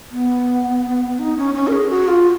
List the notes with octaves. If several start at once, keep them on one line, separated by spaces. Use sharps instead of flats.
B3
D#4
C#4
C#4
A#4
G#4
F#4
F4